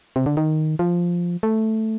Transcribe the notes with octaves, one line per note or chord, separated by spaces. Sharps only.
C3
D3
D#3
F3
A3